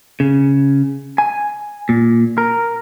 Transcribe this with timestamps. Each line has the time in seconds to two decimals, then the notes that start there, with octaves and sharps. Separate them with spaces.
0.20 C#3
1.18 G#5
1.89 A#2
2.38 A#4